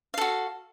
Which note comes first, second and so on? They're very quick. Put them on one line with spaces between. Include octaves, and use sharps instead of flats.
F5 A4 F#4